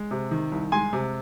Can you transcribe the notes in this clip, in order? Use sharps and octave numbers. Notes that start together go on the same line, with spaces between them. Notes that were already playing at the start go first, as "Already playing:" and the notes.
Already playing: G#3
C3
D#3
C2
G#3 G#5 C6
C3